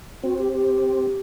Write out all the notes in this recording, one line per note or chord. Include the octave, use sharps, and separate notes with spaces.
C4 F#4
G4
G4